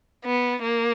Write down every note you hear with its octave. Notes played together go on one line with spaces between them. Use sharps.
B3
A#3